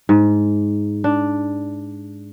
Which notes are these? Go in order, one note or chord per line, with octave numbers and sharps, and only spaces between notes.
G#2
D4